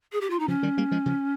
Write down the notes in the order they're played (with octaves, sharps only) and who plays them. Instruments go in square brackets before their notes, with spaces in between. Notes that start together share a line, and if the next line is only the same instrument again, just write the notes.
[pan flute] G#4
G4
F4
D#4
[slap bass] C#3 F3 [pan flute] C#4
[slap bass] D#3 G3
G3 A#3
F3 G#3
C#3 F3